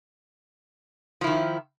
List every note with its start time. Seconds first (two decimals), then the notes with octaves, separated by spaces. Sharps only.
1.21 F3
1.24 E4
1.27 D#3